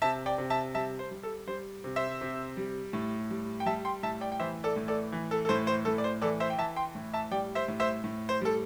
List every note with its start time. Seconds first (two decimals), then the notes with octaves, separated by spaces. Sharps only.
0.02 C3 E5 A5
0.26 D5 G5
0.38 C3
0.50 E5 A5
0.75 G3 E5 A5
0.99 C5
1.11 G3
1.23 A4
1.47 G3 C5
1.84 C3
1.96 C5 E5
2.21 C3
2.57 G3
2.93 A2
3.30 G3
3.60 G5
3.66 G3 E5 A5
3.85 G5 C6
4.03 A2 E5 A5
4.21 D5 G5
4.32 G5
4.40 E3 C5 E5
4.64 A4 D5
4.76 A2
4.88 A4 D5
5.12 E3
5.31 A4
5.45 A4
5.49 A2 C5
5.67 C5
5.85 A2 A4
5.98 D5
6.04 C5
6.22 E3 A4 D5
6.40 C5 E5
6.50 G5
6.58 E3 E5 A5
6.76 G5 C6
6.95 A2
7.13 E5 A5
7.31 G3 D5 G5
7.55 C5 E5
7.68 A2
7.80 C5 E5
8.04 A2
8.29 C5
8.41 G3 A4